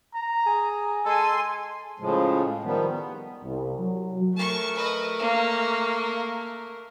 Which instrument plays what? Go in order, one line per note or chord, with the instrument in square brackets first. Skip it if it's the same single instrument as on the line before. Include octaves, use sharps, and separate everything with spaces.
[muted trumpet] A#5
[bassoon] G#4
[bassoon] G#3 [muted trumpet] A4 [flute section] G#5 C6
[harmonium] A2 C#3 F3 G#3
D#3 F3 G3 B3
B3
[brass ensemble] C2
F#3
[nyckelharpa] A3 A#4 [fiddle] A5 C#6
[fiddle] B4 D#5
A#3